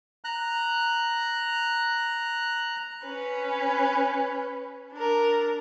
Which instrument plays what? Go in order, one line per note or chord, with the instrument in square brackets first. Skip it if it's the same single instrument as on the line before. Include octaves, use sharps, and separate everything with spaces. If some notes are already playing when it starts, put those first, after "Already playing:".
[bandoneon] A#5 F#6
[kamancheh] C#4 B4
D4 A#4